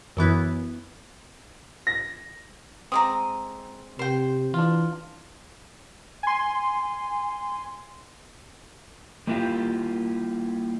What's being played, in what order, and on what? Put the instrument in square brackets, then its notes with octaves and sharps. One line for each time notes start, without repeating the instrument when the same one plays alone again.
[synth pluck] F#2 E3 B3 E4
[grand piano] A#6
[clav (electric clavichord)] G#3 C4 [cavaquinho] A#5 D6 D#6
[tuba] C3 [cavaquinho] C5 G5
[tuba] E3 [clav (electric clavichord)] D4 F4
[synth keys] G#5 C6
[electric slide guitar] G3 A#3 E4 F4 G4